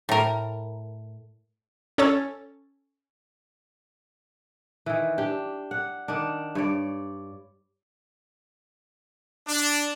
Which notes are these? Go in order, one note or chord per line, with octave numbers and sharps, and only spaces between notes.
A2 A#4
C#4 A4 C#5 A6
D#3 E3
D4 G4
F#5
D#3 D4
G2 C#5 D5
D4